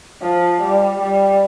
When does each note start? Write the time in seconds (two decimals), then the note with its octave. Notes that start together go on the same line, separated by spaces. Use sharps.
0.22 F3
0.61 G3
1.01 G3